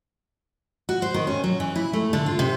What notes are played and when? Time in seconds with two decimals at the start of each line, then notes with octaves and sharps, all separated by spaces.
0.89 F#4
1.02 C5
1.14 D#3
1.27 C#4
1.44 F#3
1.60 E3
1.76 E4
1.93 A3
2.13 D3
2.26 F4
2.39 C3